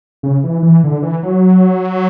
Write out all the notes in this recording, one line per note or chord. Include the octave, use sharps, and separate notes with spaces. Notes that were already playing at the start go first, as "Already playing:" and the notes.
C#3
E3
E3
D3
E3
F#3